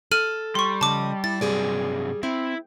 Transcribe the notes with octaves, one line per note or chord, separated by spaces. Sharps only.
A4 F6 D#7 F#7
G3 C6 C#6
C#3 F3 D#5 A5 D6
E4 A6
G2 C3 F#3 G3 G#4 D5
C4 E4